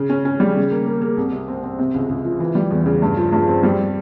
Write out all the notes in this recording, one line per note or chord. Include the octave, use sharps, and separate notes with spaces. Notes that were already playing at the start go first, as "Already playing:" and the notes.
Already playing: C#3
C#4
C#4
G3
C#3
A#3
A#3
A#3
C2
C3
C4
C4
C3
C#2
C#2
F3
E3
G3
E2
C#3
G2
F3
G2
C4
G3